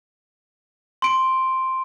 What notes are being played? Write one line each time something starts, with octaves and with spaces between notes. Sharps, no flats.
C6 D7